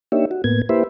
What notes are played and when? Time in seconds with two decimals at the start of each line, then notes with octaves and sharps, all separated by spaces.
0.12 A#3 D4 D#4 G4 C#5 E5
0.31 F#4
0.44 A2 A#3 B3 G#6
0.69 A#3 E4 G4 B4 C5 E5